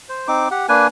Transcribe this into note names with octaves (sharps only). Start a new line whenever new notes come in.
C5
C4 D#4 D6
G4 F#5
A#3 D4 B4 G#5